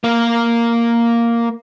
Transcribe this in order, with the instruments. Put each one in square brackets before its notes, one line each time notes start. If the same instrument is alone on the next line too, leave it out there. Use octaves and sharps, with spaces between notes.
[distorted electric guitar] A#3 F5